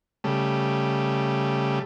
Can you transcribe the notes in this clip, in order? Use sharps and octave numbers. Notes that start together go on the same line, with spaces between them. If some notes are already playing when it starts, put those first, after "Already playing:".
C#3 G3 A3